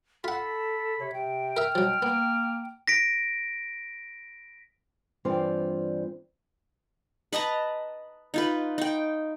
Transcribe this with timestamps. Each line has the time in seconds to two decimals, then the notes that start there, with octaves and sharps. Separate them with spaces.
0.24 F4 A4 F#5 B5
1.00 C3 C#5
1.14 C3 G5
1.57 A#4 E5 F6
1.75 B2 F3 F#3
2.02 A#3 B3
2.88 A#6 B6 D7
5.25 G2 E3 C4 F4 D5
7.33 B4 D#5 A5 A#5
8.34 D#4 F4 B4
8.78 D#4 G5